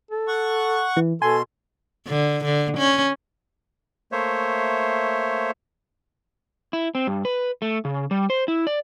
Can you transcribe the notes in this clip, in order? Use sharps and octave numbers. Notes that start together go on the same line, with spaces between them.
A4
F#5 C#6
E3
B2 A4 G#5 C6
D3
D3
C#4
A3 A#3 C5 C#5 E5
E4
C4
G2
B4
A3
C#3
G3
C5
E4
D5